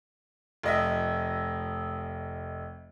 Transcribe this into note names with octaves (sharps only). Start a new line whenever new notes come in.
F1 D#5 E5